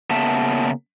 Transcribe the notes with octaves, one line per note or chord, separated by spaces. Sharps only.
C#3 A#3 B3 E5 A5